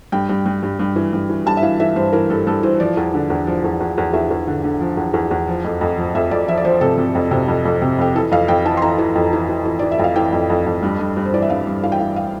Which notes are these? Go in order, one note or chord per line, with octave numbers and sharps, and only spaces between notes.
G2 G5
G2
G2
G2
G2
E3
G2
E3
G2 A5
E5
E3 F5
E3 E5
G2 C5
E3 A#4
G2 A4
G2 A4
E3 C5
F3 D5
E2
D3
E2
F3
E2
E2
E2
E2 E5
E2
D3
D3
F3
E2
E2
E2
F3
F2
F2
F3
F2 E5
F2 D5
F3 E5
D5
F3 C5
C3 A4
C3
F2
C3
F2
F2
C3
F2 G4
E3 A4
F2 F5
F2 G5
E3 A5
C6
E3 A#5
E3
F2
E3
E3
E3
E3 D5
E5
F2 F5
E3 G5
F2
F2
F2
G2
G2
G2
C5
E3 D5
E5
G2 F5
G2
E3 F5
G5
E3 F5
F5